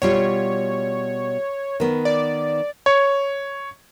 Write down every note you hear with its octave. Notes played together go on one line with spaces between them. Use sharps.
B2 G3 F4 C#5
D#3 B3
D5
C#5